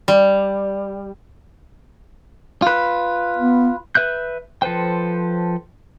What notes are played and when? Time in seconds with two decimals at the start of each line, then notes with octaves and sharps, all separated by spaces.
0.08 G3
2.62 F4 B4
3.37 B3
3.95 B4 E5 F#6 G6
4.62 F3 A4 B4 C5 G5